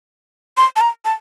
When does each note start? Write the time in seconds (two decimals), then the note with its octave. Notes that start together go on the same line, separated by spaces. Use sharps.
0.57 C6
0.76 A5
0.81 A#5
1.05 A5